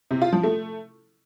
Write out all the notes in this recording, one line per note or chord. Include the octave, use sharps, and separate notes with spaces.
C3
F4
F3
A3